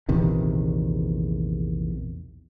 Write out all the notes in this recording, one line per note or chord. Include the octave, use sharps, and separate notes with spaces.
A#1 E2 C3 D#3